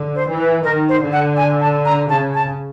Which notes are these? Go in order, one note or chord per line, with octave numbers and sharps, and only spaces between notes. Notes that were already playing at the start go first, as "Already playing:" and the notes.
Already playing: D3
C5
E3
B4
D#3 A#4
C5
D3
F#5
G#5
A5
A#5
C#3 A5
A5